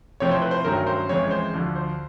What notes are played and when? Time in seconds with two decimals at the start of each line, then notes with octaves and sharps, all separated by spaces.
0.20 C3 F3 A3 C4 E4 C#5
0.31 C5
0.42 B4
0.51 C5
0.65 G2 D#3 F#3 A3 C#4 A#4
0.87 C5
1.09 F2 C#3 E3 G#3 C#5
1.31 C5
1.54 D2 D3 F3
1.75 C5